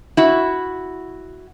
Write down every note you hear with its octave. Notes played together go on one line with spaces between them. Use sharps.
E4 F#4